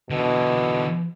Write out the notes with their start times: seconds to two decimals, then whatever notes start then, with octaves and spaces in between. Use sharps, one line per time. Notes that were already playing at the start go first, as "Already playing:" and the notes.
0.10 B2 D3 E3